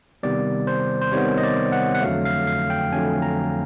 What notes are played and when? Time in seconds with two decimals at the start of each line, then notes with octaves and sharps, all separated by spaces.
0.23 C3 D#3 G3 B3 D5
0.67 C5
1.02 C5
1.12 C3 D#3 G3 B3 C#5
1.38 D#5
1.43 D5
1.72 F#5
1.95 F#5
2.02 F2 D3 F#3 A3 F5
2.25 F5
2.47 F5
2.70 G5
2.93 F2 D3 F#3 A3 G#5
3.22 A#5